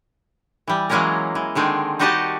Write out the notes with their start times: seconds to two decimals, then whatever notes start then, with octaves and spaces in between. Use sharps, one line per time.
0.67 E3 G3
0.90 E3 F#3 G#3 A#3 C#4 A#4
1.35 E3
1.55 D3 D#3 G#3 C4
1.99 G3 D#4 F#4 G4 D#5 A5